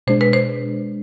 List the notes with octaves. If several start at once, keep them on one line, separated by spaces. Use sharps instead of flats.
B2 G#3 D4 C5
B4
C5